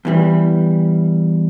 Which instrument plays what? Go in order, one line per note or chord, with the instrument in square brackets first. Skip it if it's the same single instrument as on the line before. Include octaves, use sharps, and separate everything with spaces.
[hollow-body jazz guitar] E2 E3 G3